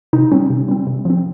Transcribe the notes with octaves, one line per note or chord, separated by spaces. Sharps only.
C3 D#4
G3 C4 C#4
C3
G3 C4
C3
F3 C4